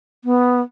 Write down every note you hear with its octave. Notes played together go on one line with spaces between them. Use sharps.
B3